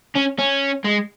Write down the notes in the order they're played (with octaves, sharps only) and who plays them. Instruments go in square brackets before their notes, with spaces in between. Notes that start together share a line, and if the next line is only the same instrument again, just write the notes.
[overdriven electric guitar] C#4
C#4
G#3